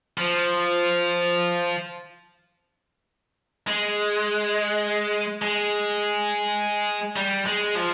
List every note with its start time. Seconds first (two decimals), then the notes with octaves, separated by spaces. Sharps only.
0.18 F3
3.67 G#3
5.42 G#3
7.16 G3
7.46 G#3
7.75 F3